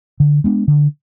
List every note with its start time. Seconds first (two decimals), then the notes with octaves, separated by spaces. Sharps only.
0.20 D3
0.44 G#3 B3 D4
0.68 D3